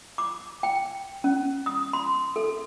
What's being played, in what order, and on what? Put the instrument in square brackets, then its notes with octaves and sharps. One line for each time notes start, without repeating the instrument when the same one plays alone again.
[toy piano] D6
G5
C#4
D#6
C6
A4